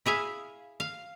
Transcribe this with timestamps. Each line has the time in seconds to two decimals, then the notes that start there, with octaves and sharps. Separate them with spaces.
0.06 E4 G#4 E5 F5
0.80 F5